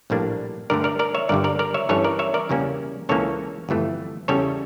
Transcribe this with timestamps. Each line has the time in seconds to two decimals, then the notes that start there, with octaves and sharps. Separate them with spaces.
0.10 A#1 A2 G3 A#3 D4
0.70 G2 D3 A3 A#4 D5
0.84 A#4 D5
0.99 A#4 D5
1.15 C#5 E5
1.29 G1 G2 D3 G3 A#4 D5
1.44 A#4 D5
1.59 A#4 D5
1.74 C#5 E5
1.89 G2 E3 G3 C#4 A4 C#5
2.04 A#4 D5
2.19 C#5 E5
2.34 A#4 D5
2.49 E2 C#3 G3 A#3 C#4
3.09 C#2 C#3 E3 A#3 C#4 A4 C#5
3.69 G1 F2 E3 A3
4.28 E2 C#3 G3 C#4 A4 C#5